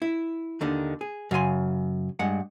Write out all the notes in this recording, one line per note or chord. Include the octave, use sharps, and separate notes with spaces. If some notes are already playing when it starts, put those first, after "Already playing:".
E4
D#2 D3 D#3
G#4
F#2 C#3 F5 G#5 C6
G2 G#3 F#5